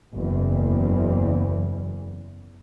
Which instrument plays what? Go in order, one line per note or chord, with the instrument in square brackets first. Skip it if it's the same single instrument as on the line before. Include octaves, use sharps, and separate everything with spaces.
[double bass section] F#1 E2